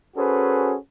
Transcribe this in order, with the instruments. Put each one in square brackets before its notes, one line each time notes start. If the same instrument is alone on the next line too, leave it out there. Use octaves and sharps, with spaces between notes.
[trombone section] C#4 F#4 G#4 A4 B4 C5